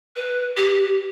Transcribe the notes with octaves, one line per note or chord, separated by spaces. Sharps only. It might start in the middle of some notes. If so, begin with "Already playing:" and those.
B4
G4